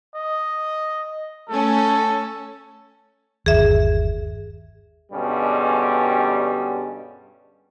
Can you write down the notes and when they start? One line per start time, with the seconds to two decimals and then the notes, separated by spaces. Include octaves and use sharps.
0.15 D#5
1.49 A3 C#4 A4
3.46 G1 D#2 G#4 E5
5.12 G2 B2 D3 G3 G#3 C#4